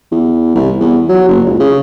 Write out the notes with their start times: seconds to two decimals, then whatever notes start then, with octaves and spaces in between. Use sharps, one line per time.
0.12 E2
0.55 C2
0.81 E2
1.09 F#3
1.29 F#1
1.46 C#2
1.60 C#3